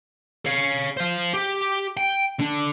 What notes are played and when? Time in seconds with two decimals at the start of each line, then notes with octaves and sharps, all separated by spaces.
0.46 C#5 F5
0.97 C5 F5
1.33 G4
1.97 G5
2.39 D3 D4